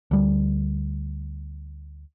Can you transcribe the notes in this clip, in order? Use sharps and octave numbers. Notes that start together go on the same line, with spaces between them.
D2 G3